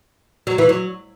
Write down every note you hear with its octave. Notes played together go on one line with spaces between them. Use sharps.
F#3
E3
F#3